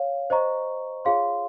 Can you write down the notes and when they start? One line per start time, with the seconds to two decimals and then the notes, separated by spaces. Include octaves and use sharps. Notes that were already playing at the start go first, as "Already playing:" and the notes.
Already playing: C#5 F5
0.30 C5 D#5 A#5 C#6
1.05 F4 G#4 C#5 F5 C6